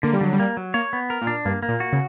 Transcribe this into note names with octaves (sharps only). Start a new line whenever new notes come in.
D3 A#3
G3
D3 F#3
G3
A#3
F#3
A#3 C#5
B3
A#4
A#2
D4
G2 A#3
A#3
A#2
F#4
C#3